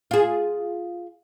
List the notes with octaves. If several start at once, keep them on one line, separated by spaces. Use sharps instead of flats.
F4 G#4